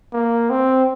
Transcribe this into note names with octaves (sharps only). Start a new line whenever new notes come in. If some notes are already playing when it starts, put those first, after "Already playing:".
A#3
C4